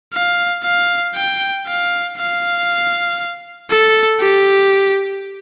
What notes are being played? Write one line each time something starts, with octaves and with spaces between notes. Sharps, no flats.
F5
F5
G5
F5
F5
A4
G4